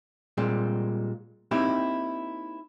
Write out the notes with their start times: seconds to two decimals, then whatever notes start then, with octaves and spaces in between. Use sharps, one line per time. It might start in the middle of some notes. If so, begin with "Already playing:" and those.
0.37 A#2 G3 G#3 C4
1.51 A#3 C4 D#4 E4 G4